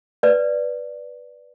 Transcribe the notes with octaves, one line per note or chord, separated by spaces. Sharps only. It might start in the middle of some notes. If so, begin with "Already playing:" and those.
B4 D5